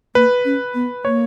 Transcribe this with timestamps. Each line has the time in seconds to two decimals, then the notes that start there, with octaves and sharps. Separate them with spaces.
0.15 A#3 B4
0.45 C#4
0.74 B3
1.04 A#3 C#5